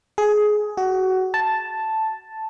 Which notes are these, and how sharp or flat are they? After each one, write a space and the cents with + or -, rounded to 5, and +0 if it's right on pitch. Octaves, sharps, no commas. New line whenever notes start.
G#4 +15
F#4 +20
A5 +0